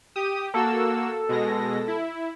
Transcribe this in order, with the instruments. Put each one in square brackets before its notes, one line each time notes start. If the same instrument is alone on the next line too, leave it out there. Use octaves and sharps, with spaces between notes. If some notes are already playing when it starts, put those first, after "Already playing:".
[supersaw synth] G4 [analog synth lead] D#6
[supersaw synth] A#3 F#4 E6 [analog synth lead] A4
[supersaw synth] B2 G#3 A#6
E4